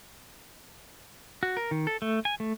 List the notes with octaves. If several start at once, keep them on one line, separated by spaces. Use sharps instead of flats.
F#4
A#4
D#3
A4
A3
G#5
A3